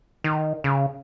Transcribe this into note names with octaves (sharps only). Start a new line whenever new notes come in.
D#3
C#3